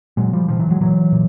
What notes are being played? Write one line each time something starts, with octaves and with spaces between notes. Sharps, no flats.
A#2 F#3 G#3
F3 G3
A#2 D#3 F3
E3 F#3
F#3 G#3
A#2 E3 F#3
A#2